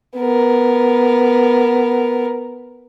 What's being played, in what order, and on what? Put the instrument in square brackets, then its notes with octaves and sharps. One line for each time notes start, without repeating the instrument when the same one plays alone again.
[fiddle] B3 A#4